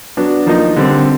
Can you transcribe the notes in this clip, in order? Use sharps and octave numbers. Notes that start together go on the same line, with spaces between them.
F#3 B3 D4
F3 A#3 D#4
D3 G3 C4